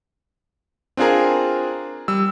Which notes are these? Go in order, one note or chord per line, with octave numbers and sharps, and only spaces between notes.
C4 D4 F4 G#4 A#4
G3 E6